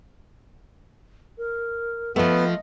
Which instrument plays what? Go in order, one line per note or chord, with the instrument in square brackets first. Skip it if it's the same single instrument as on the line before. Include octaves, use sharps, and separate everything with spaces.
[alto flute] A#4
[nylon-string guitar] F3 A3 [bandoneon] B3 [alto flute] D#5